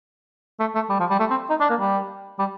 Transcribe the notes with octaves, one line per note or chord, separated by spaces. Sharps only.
A3
A3
G3
F3
G3
A3
C4
D#4
D4
A#3
G3
G3